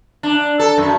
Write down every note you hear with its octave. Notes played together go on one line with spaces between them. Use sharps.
D4
A4
F#2